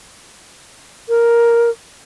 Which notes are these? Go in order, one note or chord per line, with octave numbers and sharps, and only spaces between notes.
A#4